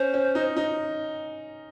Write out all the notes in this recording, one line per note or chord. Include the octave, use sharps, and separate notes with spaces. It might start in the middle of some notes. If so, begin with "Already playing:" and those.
Already playing: C#4 C5
C#4
D#4
D#4